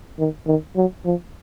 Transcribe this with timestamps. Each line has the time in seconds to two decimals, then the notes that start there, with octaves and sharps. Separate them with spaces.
0.19 D#3
0.47 D#3
0.76 F#3
1.05 F3